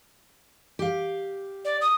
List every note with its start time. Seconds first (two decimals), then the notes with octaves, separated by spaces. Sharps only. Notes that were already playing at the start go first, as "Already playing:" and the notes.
0.79 G4 F5
1.65 D5
1.81 D#6